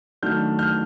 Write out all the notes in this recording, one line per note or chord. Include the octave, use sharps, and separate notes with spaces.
D#3 F#3 A3 D4 F6 G6
F6 G6